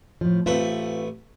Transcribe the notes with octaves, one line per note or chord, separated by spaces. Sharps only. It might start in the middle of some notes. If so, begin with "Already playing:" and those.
A2 F3
A1 A3 C4 F4 B4